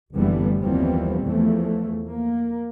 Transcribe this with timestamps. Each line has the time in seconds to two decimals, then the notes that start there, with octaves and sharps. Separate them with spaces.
0.14 F#1 D3 E3 G3 A3 B3
0.62 D#2 E3 F3 G3 B3 C4
1.23 E2 E3 F3 A3
2.09 A#3